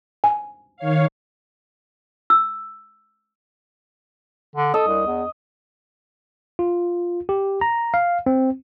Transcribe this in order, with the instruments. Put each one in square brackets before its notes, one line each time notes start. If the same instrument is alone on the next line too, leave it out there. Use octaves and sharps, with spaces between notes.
[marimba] G#5
[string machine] D#3 C#5 F5
[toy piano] E6
[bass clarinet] D3
[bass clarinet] A4 [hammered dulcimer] D#5
[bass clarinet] C2
E2
[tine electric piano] F4
G4
A#5
F5
C4